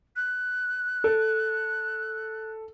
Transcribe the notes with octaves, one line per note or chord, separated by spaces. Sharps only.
F#6
A4